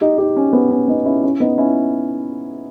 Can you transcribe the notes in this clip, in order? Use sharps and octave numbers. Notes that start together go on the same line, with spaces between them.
D#4 G4
D#4 G4
C#4
B3
C#4
B3 D#4
C#4 E4
C#4 E4
B3 D#4
C#4 E4